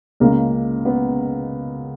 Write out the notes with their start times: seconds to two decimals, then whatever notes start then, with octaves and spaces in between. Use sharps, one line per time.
0.20 C#2 C#3 G#3 A#3
0.85 B3